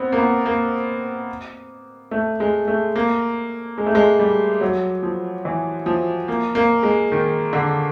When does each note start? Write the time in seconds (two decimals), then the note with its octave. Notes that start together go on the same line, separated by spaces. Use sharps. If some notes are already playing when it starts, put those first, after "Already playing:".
Already playing: B3 C4
0.12 A#3
0.18 B3
0.46 A#3
2.11 A3
2.40 G#3
2.68 A3
2.96 A#3
3.78 G#3
3.86 A3
3.95 G#3
4.19 G3
4.61 F#3
5.03 F3
5.45 E3
5.86 F3
6.28 A#3
6.55 A#3
6.83 G#3
7.12 D#3
7.53 D3